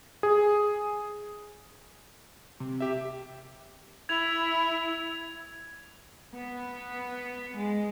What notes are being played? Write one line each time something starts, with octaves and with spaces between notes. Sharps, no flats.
G#4
C3
G4 E5
E4 G#6 F7
B3
G#3